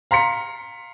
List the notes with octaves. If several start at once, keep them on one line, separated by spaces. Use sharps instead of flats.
F5 A#5 C6 B6 C#7